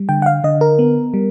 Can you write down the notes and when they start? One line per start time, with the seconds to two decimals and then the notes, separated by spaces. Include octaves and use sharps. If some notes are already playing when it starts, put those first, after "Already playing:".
Already playing: G3
0.09 D3 G5
0.22 F#5
0.26 F5
0.44 D3 D#5
0.61 A#4
0.79 B3
1.14 G3